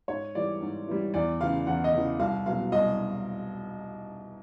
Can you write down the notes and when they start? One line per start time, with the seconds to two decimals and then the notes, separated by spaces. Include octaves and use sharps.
0.08 G#2 C#5
0.35 E3 G3 D5
0.61 G#2
0.88 E3 G3
1.14 E2 D5
1.41 C#3 E3 F5
1.67 E2 F#5
1.84 D#5
1.94 C#3 E3
2.20 C2 F5
2.46 B2 F#3 F5
2.72 C2 D#5